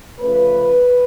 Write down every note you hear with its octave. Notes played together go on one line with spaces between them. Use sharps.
C#3 F3 A3 B4